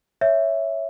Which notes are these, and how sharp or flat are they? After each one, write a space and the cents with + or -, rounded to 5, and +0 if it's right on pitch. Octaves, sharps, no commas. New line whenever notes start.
C#5 +0 E5 +0